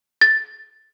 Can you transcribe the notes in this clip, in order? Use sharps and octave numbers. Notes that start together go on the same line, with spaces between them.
A6